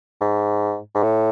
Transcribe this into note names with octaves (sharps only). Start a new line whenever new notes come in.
G#2
G#2
A2